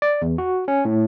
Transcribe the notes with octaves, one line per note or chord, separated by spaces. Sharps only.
D5
E2
F#4
C#4
A2